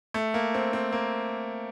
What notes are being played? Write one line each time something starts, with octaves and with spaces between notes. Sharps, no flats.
A3
A#3
C4
C4
A#3